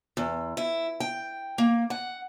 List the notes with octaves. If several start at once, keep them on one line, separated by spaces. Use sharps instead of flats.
E2
E4
G5
A#3
F#5